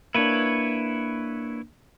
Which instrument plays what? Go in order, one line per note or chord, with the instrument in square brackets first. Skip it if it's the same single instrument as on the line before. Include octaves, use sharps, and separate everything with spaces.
[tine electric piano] A#3 D4 [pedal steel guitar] E4 B4 C#5